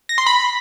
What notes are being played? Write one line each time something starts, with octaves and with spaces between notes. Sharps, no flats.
A#6
C6
B5